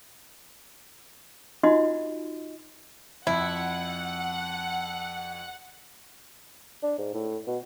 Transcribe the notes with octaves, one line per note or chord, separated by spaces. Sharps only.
D#4 F4 F#4 D#5 C6
F2 E4 F#5
D4
G#2
A2
B2